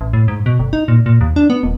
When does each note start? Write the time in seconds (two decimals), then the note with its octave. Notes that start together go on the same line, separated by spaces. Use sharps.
0.01 A1
0.13 A2
0.28 G#2
0.46 B2
0.59 G1
0.73 D#4
0.88 A#2
1.06 A#2
1.21 D#2
1.36 D4
1.50 B3
1.63 D#1